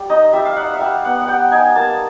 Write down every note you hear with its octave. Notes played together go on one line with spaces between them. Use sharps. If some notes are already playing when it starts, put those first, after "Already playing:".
Already playing: G3
D#4 D#5
G3 E5
F5
D#4 F#5
E5
G3 F5
B3 F#5
F#5
G3 G5
D#4 G#5
A#3 A5